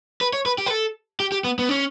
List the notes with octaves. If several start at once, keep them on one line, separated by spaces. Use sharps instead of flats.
B4
C#5
B4
G4
B4
A4
G4
G4
B3
B3
C#4